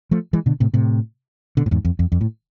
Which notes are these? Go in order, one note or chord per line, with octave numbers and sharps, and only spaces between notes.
F3 A3
E3 G#3
B2 D3
A2 C3
A2 C3
B2 D3
A2
E2 G#2
F2
F2
F2
A2